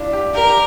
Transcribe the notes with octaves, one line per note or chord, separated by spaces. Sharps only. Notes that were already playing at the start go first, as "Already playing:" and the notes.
Already playing: D4 E4 F4
G4
G4 A#4
G4